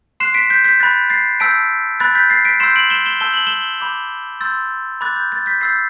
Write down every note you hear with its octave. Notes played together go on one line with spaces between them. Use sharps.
C6 F#6 C7 E7
B6 D7
G6 B6
G6 B6
B5 F#6 A6
A6 C7
A5 E6 G6 B6 D7
B5 F#6 A6
G6 B6
A6 C7
B6 D7
C6 E6 G6 C7 E7
D7 F#7
E7 G7
E7 G7
A5 E6 G6 G7
F#7
E7 G7
B5 D6 G6
C6 E6 G6 A6
B5 D6 F#6 A6
G6
A6
G6 B6
B5 E6 G6 A6 C7